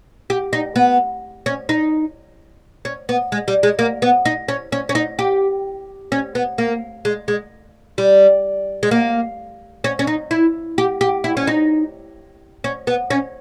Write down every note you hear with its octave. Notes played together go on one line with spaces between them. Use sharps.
G4
D#4
B3
C#4
D#4
C#4
B3
G#3
G3
G#3
A#3
B3
D#4
C#4
C#4
C#4
D#4
G4
C#4
B3
A#3
G#3
G#3
G3
G#3
A#3
C#4
C#4
D#4
E4
G4
G4
E4
C#4
D#4
C#4
B3
C#4